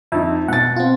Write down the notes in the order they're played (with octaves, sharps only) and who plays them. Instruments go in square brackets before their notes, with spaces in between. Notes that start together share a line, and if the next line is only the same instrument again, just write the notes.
[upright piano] F2 D#4 [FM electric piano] E5
[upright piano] B2 A6 [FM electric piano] F#5
[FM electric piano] C4 F4